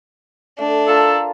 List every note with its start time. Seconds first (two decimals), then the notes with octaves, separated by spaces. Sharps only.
0.59 A3 D4
0.88 F4 A4 A#4 A5